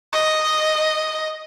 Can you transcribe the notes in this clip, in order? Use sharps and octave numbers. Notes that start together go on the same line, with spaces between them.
D#5